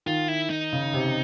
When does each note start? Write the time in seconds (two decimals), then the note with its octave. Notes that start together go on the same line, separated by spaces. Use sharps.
0.06 D#3 F4
0.28 E4
0.50 D#4
0.73 C#3
0.94 C3